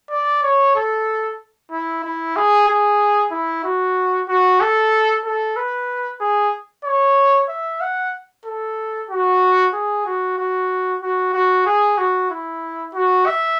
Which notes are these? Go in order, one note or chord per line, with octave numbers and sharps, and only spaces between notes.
D5
C#5
A4
E4
E4
G#4
G#4
E4
F#4
F#4
A4
A4
B4
G#4
C#5
E5
F#5
A4
F#4
G#4
F#4
F#4
F#4
F#4
G#4
F#4
E4
F#4
E5